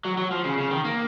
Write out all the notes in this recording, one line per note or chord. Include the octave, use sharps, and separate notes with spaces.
F#3
F#3
F3
C#3
C#3
D#3
A#3